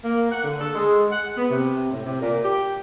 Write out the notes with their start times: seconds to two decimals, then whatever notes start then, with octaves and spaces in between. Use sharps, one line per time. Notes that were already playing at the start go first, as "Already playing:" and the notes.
0.04 A#3
0.31 F#5
0.43 D3
0.60 A4
0.75 G#3
1.11 F#5
1.36 B3
1.50 C3
1.92 A2
2.05 C3
2.21 A#2
2.43 G4